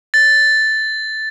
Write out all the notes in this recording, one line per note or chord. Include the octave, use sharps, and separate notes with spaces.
A6